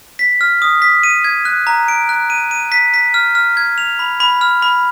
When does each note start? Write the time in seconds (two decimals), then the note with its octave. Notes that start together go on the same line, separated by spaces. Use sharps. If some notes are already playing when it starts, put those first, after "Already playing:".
0.19 B6
0.41 F6
0.62 D#6
0.82 B6
1.03 D#7
1.24 G#6
1.45 F#6
1.67 A#5
1.88 D7
2.09 F#6
2.30 D#7
2.51 D#7
2.72 B6
2.94 B6
3.14 F6
3.35 F6
3.57 G#6
3.78 F7
3.99 B5
4.20 B5
4.41 F6
4.62 B5